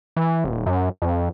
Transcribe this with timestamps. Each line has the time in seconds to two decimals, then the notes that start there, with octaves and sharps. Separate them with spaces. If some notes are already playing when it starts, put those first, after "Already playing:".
0.16 E3
0.44 D#1
0.66 F#2
1.02 F2